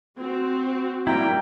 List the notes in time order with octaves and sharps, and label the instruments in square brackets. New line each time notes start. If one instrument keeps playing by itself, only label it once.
[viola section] C4 F#4
[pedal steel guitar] G3 A#3 E4 [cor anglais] G5 [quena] A#5